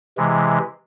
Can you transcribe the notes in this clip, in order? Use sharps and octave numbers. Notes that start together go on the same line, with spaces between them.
C3 E3 G#3